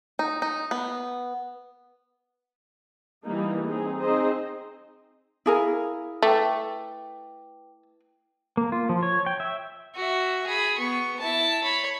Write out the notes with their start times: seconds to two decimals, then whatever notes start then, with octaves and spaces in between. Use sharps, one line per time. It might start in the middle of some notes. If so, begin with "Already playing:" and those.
0.19 D#4
0.42 D#4
0.71 B3
3.25 E3 G3 A#3 D#4
3.66 C4 D#4 G#4
4.00 C4 D#4 G#4 C5 D#5
5.46 E4 G#4 A#4 F5
6.22 A3 B4 G5 D6
8.57 A#3
8.72 F4
8.89 F3
9.03 C#5
9.26 G5
9.40 E5
9.95 F#4 E5
10.47 G#4 B5
10.78 B3 C#6
11.20 E4 A5
11.64 C#5 B5